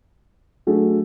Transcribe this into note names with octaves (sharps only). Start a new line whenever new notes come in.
F#3 A3 D4 G#4